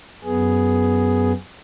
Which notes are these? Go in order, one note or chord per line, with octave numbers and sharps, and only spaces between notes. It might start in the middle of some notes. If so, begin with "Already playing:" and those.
F#2 B3 G#4